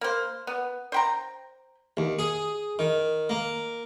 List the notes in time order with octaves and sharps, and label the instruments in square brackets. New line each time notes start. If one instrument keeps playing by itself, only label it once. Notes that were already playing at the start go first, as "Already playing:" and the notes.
[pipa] A#3 C5
B3
C5 G5 A#5
[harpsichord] D#2
G#4
D#3
A#3